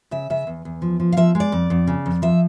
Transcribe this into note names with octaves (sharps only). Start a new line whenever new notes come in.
C#3 E5
C#3 E5
E2
E2
F3
F3
F5
F3 E5
G#3
D5
F2
F2
C#3
F2
F3 E5